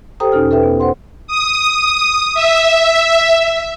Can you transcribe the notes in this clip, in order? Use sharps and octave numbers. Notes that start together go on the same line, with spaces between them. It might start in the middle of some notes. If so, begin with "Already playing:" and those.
G4 A4 C5 G5 A#5 D#6
E2 B2 C#4 D#4 A4 F6
A4 B4 E5 G5
B3
C5 F#5 C6
D#6
E5